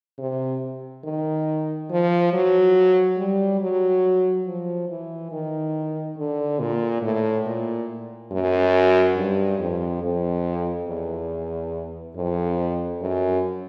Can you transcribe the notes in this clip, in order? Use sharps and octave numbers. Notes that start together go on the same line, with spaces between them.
C3
D#3
F3
F#3
G3
F#3
F3
E3
D#3
D3
A#2
A2
A#2
F#2
G2
F2
F2
E2
F2
F#2